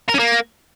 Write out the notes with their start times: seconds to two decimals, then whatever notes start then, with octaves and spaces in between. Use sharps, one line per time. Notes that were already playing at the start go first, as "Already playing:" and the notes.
0.09 A#4
0.14 C#4
0.19 A#3